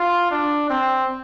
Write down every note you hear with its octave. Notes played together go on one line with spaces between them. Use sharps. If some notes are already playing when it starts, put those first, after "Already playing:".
Already playing: F4
D4
C4